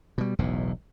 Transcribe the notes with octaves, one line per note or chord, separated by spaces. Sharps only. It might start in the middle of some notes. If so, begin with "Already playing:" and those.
B2 G3
E1 B1 E2 A2